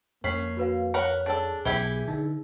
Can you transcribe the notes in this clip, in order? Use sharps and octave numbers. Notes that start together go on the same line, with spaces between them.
F2 A#3 C#4 B6 C7 F#7
F#4 B4 F5
A#4 B4 C#5 F#5
D4 G#4 A4
B1 E3 E4 G4 G#6 G7
D3 D#4